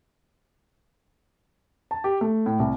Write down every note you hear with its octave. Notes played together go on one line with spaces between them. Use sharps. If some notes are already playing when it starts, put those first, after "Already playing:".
A5
G4
A3
A2
C2